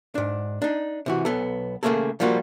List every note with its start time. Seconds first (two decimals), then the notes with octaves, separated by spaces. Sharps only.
0.15 G#2 D4
0.62 D4 D#4
1.06 C3 E3 F#4
1.25 B1 B3 A4
1.83 C#3 F#3 A3 A#3 G#4 A4
2.20 F3 G3 A#3 F4 F#4